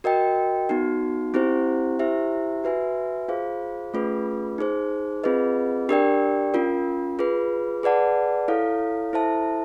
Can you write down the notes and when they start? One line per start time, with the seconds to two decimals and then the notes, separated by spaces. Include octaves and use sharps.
0.04 F#4 A#4 D#5 G5
0.69 B3 D#4 F#4
1.34 C4 E4 G4 C5
1.99 E4 G4 C5 E5
2.64 F#4 B4 E5 G#5
3.28 F4 G#4 C5 F5
3.94 A3 C#4 F4 G#4 B4
4.58 D#4 G#4 C5
5.24 C4 F4 G#4 B4 D#5
5.89 D4 G4 A#4 D5 G5
6.54 C#4 F4 A#4
7.19 F4 G#4 B4
7.83 G#4 B4 D5 F#5 A5
8.48 E4 A4 C#5 F5
9.13 E4 A4 C5 E5 A5